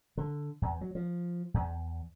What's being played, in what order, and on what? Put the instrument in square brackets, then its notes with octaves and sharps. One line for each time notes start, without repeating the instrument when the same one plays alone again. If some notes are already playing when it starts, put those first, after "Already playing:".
[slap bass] D3
E2
F#3
F3
E2